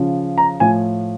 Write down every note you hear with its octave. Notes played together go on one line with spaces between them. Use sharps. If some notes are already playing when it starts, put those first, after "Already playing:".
Already playing: C#3 F3
A#5
A2 F3 G#5